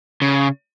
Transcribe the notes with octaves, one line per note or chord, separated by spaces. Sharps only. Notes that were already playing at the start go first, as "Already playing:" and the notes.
C#3